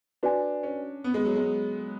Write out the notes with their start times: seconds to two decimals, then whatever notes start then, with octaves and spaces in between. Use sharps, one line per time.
0.23 D4 F#4 B4 D5 G#5
0.63 C#4
1.04 B3
1.14 G#3
1.25 F#3
1.36 G#3